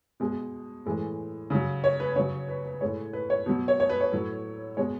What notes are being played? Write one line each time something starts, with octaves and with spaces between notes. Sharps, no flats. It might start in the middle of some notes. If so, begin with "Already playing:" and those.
B2 G#3
A2 E3 G#3
C#3 F#3
C#5
B4
C#3 F#3 C#5
B4
B4
A2 G#3 C#5
B4
C#5
B2 F#3
C#5
C#5
B4
C#5
A2 F#3
B2 G#3 C#5